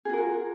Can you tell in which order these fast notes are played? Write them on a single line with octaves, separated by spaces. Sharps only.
G#4 F#4 A#4 F4